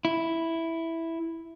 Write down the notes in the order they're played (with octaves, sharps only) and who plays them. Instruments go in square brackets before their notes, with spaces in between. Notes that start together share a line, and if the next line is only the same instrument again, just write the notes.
[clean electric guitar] E4